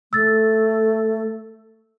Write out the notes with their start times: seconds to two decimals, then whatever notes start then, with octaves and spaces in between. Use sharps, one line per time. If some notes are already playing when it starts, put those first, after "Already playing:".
0.13 A3 E6 A6